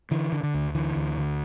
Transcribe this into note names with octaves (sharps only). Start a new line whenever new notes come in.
D3 E3
D3
D3
D2
D3 E3
D2
D3